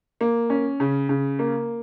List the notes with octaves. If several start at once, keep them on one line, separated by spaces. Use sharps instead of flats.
A#3
C#4
C#3
C#3
A#3